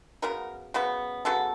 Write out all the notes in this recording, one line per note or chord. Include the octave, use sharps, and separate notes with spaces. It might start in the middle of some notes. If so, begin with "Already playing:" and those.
C#3 F#3 B3 A#4
C#3 F#3 B3
C#3 F#3 B3 A4